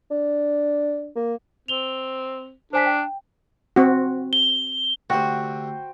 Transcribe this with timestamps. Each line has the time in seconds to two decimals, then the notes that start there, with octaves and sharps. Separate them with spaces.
0.11 D4
1.16 A#3
1.68 C4 F7 G7
2.73 D4 C5 G#5 B6
2.86 G5
3.76 C4 F#4
4.33 G7
5.10 D2 C3 F#4 C5 F#5 G5